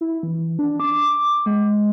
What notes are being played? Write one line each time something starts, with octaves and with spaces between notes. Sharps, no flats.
E4
E3
D4
D6
G#3